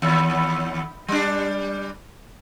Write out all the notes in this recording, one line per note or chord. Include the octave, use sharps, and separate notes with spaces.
D#2
G3 D4